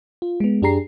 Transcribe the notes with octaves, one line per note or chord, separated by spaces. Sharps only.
F4
G#3 B3
F#2 D4 G4 G#4 A#5 C7